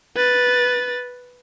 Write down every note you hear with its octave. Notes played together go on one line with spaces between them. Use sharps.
B4 A6